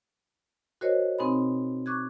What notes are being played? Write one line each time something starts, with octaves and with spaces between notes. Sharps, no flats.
F#4 A#4 C5 C#5 D#5
B2 C4 D#4 G#5 B5
C#6 D6 F#6 G#6